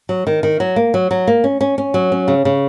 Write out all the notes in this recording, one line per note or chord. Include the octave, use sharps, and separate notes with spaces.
F#3
D#3
D#3
F#3
A#3
F#3
F#3
A#3
C#4
C#4
C#4
F#3
C#4
C#3
C#3